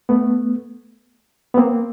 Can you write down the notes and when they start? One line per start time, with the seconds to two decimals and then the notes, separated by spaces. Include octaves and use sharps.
0.09 A3 B3
1.54 B3
1.57 A#3 C4